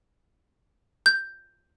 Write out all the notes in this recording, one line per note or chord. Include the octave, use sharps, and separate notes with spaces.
G6